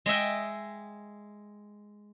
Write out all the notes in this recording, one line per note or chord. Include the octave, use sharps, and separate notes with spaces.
G#3 D#5 E5 G5